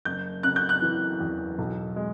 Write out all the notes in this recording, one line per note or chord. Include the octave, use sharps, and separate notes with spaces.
F#1 G6
C#3 F#6
G6
F#6
E3
E2
B1
G#3